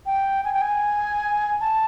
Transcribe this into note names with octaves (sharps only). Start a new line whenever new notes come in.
G5
G#5
G5
G#5
A5